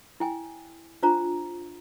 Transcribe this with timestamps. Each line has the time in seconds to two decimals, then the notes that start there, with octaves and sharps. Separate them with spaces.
0.20 E4 G5 G#5
1.03 D4 F4 C5 A#5